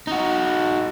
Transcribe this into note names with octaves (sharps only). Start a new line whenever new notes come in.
D#4 F#4